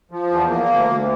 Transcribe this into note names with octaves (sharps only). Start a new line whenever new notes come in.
F3
E2
A#3
D2
D2